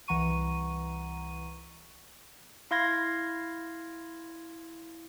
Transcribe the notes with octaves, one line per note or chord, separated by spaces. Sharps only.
C2 E3 F#5 A#5 C#6 D#7
E4 F5 C6 G#6 A#6